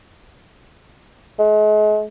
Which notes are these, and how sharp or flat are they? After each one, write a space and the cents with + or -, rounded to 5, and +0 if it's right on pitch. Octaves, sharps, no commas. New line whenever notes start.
G#3 +40